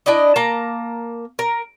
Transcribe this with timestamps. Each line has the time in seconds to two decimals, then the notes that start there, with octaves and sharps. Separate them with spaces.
0.06 D4 E4 D5 D#5
0.36 A#3 A5 A#5
1.39 A#4